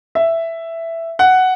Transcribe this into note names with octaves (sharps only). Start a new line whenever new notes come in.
E5
F#5